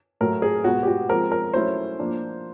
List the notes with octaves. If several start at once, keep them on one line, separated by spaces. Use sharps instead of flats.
A2 F#3 A3 A#4
G#4
B2 G#3 B3 F#4
G4
F#4
F3 G#3 C4 A#4
A#4
F#3 A3 C#4 E4 C5
F3 A#3 D4